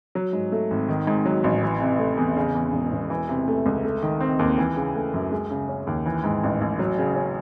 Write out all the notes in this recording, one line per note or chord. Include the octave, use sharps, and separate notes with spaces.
F#3
G#2
A3
G#1
D#3
G#2
F#3
A1
E3
C3
A3
E2
C#3
E2
E1
E1
E3
C3
A3
C#2
A3
D#3
C4
D#2
E3
C#3
A3
F#2
G#3
C#3
C#4
D#2
E3
G#2
A1
A1
F#3
C#3
C#4